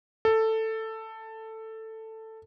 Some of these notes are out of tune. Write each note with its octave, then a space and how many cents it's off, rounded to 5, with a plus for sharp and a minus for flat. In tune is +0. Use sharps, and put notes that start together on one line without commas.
A4 +10